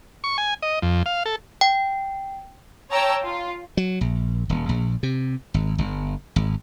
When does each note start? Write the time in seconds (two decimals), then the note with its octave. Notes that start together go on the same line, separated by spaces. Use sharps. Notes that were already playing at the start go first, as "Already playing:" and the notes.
0.24 C#6
0.38 G#5
0.63 D#5
0.82 F2
1.06 F5
1.26 A4
1.61 G5
2.91 C#5 G5 A5 A#5 E6
3.25 F4
3.77 F#3
4.01 A#1
4.49 D#1
4.69 A#1
5.03 C3
5.54 G#1
5.78 G1
6.36 G#1